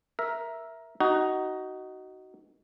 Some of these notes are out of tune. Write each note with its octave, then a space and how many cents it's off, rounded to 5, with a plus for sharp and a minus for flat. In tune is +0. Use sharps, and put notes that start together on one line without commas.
A#4 +10 E5 +0
D#4 +5 F#4 +20